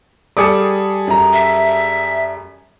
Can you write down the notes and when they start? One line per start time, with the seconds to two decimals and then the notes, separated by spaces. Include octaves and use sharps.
0.37 G3 G#4 A4 D6 D#6 C#7
1.07 F#2 A#5
1.33 E5